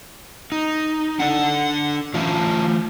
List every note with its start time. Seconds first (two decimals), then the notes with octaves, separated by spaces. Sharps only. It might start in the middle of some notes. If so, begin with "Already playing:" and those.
0.52 D#4
1.20 D4 A4 D5 F#5
2.14 E3 A3 C#4 F4